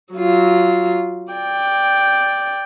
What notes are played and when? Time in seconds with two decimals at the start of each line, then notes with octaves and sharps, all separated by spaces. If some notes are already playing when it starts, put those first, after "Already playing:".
0.13 F#3 F4
1.32 D5 G5